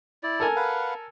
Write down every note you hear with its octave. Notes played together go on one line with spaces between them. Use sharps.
E4 D5
A4 A#4 G#5
B4 F5 F#5